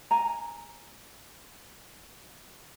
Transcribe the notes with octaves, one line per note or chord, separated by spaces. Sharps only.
G#5 A#5